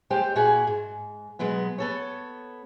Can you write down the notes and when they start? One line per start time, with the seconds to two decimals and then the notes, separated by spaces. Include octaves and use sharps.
0.10 D#2 G#3 G4 C5 G5
0.35 A#2 E4 F#4 G#4
0.67 G#2
1.39 B2 F#3 G#3 B3
1.78 B3 A4 C#5